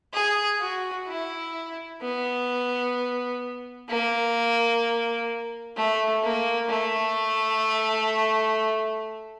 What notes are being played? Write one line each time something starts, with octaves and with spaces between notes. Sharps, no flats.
G#4
F#4
E4
B3
A#3
A3
A#3
A3